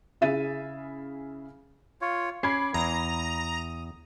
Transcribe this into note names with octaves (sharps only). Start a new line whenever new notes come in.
C#3 E4 G#4 E5 A6 D#7
F4 C#5
C#4 B5 D6 G#6 C7
E2 A#5 D#6